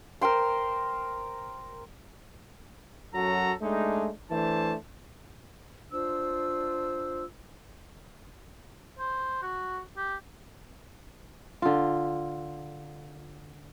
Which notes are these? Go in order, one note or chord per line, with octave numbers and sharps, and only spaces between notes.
A#4 C5 G5 C6
F#2 F#3 F#4 A4 A#5
G#3 A3 D4 D#4
E3 A3 D4 C5 A5
D4 F4 C5 E6
C5
F#4
G4
D3 F4